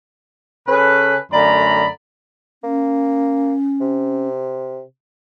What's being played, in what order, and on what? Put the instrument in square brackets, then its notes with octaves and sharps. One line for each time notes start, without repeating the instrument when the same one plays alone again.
[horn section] C#3 C#4 A4 B4
F#2 D3 A3 D5 A#5 B5
[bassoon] A#3 [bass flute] C#4
[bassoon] C3